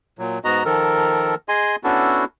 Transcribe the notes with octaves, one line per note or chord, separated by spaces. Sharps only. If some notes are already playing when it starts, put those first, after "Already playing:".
A#2 F#3
G#2 B3 F#4 D#5 A#5
D#3 F3 A4 A#4
G#4 D#5 G#5 C6
B3 C#4 D4 E4 F#4 A4